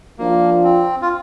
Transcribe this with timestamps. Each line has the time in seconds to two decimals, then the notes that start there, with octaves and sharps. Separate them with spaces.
0.19 F3 A#3 D4 F4
0.64 C4
1.02 F4